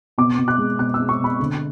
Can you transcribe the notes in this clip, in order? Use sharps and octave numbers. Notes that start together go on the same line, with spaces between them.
B2 D6
B2
F#6
G#3
B2 F#6
E6
G#3
C#6
B2 B5
D3